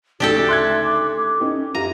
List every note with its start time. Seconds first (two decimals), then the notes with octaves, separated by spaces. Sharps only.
0.20 D2 G#2 C#3 D4 F#4 G4 A4
0.49 E5 C6 F#6 G#6
0.84 D6
1.07 D6
1.40 C#4 D#4 G4
1.75 F#2 F4 G4 A#5 D#7